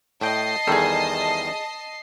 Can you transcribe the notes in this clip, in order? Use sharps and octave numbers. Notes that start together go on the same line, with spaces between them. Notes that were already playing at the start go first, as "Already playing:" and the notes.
A2 D#5 G5 A5 C7
E2 D#3 G3 G#4 A4